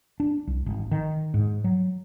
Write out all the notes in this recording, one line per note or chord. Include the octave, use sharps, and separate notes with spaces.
D4
C2
G#1
D#3
G#2
F#3